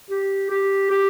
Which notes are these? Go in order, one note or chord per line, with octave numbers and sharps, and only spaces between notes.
G4
G4
G4